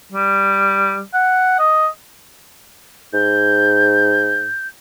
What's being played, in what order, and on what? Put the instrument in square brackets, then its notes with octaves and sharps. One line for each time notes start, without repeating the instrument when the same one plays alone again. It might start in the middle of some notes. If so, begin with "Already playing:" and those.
[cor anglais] G3
F#5
D#5
[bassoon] G#2 [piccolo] G6